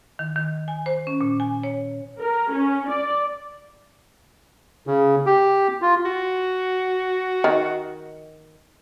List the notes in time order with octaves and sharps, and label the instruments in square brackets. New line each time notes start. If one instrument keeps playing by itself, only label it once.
[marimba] D#3
D#3
G#5
C5
C#4
A#2
G#5
C#5
[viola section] A#4
C#4
D5
[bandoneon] C#3
G4
F4
[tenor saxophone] F#4
[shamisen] D#3